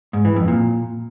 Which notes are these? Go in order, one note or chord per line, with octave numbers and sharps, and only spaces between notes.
G#2
E3
F2
A#2